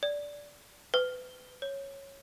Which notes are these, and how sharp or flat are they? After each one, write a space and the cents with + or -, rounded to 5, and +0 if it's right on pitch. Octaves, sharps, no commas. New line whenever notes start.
D5 -10
B4 +30
C#5 -10